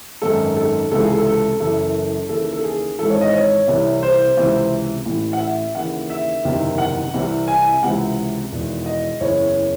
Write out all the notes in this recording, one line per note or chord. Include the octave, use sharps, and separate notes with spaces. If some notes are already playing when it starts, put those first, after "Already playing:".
G#1 F#2 D#3 A4
A4
C#2 C3 E3 A4
G#4
A4
A4
F#1 F#2 E3 A4
D#2 C#3 E3 A4
A4
G#4
G#1 G#2 E3 A4
C#5
D#5
C#5
C2 C3 E3
C5
C#2 C3 E3
A1 A2 E3
F#5
E5
D#2 C#3 E3 F#5
E5
F#1 E2 C3 D#3
F#5
C2 C3 E3
G#5
C#2 C3 E3 F#5
E1 E2 D#3
D#5
F#1 E2 C#3 E3 C#5